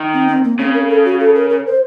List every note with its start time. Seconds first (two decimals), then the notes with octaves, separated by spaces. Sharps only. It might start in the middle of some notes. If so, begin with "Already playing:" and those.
Already playing: D#3
0.14 C4
0.28 C4
0.44 A#3
0.58 C#3 C4
0.74 A#4
0.89 A4
1.05 F#4
1.20 A4
1.35 A#4
1.50 A#4
1.66 C5